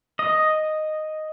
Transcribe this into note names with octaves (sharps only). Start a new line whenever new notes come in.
D#5